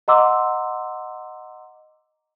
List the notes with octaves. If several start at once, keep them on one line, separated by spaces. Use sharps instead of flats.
D#5 F#5 A#5 C6 D6 E6